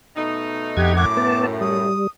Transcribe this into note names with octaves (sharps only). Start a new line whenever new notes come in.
B2 A3 D#4
F2 G4 F#5 G#6
F#2 A2 D6
B3 A5
G3 D#6